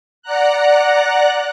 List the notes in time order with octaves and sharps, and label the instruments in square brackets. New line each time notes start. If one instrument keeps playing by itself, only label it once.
[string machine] D5 F#5 A#5 F#6